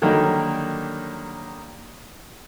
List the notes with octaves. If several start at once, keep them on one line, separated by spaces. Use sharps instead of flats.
D3 D#3 F#3 G3 A#3 D#4